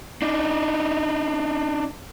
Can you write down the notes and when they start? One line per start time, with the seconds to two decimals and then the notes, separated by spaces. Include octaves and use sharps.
0.22 D4 D#4